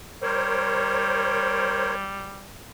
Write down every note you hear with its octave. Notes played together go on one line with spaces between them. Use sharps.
G3 A#4 C5 C#5